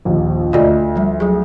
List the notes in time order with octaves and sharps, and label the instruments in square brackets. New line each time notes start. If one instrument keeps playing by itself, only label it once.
[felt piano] A#1 D#2
[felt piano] D2 [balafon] F4 D5 D#5
[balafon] F3 G3
F#3 G#4